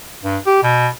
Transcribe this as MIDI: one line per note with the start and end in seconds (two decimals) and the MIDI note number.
0.24 0.38 43
0.47 0.60 67
0.64 0.88 47